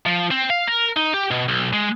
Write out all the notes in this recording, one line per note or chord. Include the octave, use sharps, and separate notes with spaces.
F3
C4
F5
A#4
D#4
G4
B2
B1
G#3